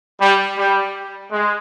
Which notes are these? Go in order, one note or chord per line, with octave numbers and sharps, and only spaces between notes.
G3
G3
G#3